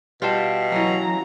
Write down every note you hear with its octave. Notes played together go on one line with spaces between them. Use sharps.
B2 G3 F4 F5 G5 A5
E3 F#3 C#4 A#5